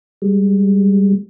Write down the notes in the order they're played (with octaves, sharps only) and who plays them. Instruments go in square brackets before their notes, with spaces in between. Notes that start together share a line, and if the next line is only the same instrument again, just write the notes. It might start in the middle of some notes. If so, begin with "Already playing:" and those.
[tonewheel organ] G3 G#3